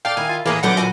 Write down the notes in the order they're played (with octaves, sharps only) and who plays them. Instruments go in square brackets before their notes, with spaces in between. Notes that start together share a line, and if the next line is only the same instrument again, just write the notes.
[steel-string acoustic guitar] A4 D5 [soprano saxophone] F5 [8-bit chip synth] G5 A6
[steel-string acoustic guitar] D#3 [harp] E4 [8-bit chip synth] G#5
[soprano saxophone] F4
[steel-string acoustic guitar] E2 A2 B3 [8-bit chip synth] E3 G#4 [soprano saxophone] A#3 [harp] B4
[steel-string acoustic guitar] A2 D3 B3 [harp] F#3 [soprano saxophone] F#5 [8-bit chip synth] D6 G6 A#6
[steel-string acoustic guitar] D#2 A#2 G#5 [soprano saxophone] F#4